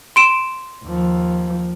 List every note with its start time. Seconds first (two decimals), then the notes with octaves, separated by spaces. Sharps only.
0.16 C6 D7 E7
0.84 D#2 F3